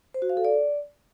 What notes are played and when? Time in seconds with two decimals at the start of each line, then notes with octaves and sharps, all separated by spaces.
0.14 C5
0.22 F#4
0.29 F5
0.37 A4
0.45 D5